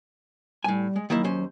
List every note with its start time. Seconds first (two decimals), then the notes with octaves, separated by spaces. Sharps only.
0.64 A2 G3 G#5
0.96 G#3
1.10 D#3 F#3 A#3 E4
1.24 D#2 C#4 C5